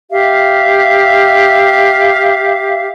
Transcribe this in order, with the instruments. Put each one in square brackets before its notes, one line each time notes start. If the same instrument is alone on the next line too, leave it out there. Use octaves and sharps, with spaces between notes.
[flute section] G4 E5 F5